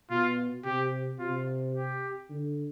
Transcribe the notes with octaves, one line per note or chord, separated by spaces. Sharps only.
B2 F4
C3 G4
C3 F4
G4
D3